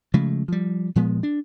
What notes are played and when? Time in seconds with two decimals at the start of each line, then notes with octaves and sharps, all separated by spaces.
0.14 C#3 F3 G#3 A3
0.48 F3 G3
0.96 A#2 F3 G#3 B3
1.23 D4